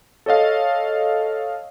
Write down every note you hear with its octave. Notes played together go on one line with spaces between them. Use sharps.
A4 C#5 D#5 F5